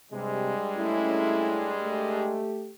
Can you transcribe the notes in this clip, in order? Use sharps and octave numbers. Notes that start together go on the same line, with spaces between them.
G2 C3 G3 G#3
A3 C#4 E4
A3 G4